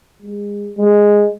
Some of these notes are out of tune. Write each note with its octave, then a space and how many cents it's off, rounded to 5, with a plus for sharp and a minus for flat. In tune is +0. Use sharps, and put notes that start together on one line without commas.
G#3 -25
G#3 -5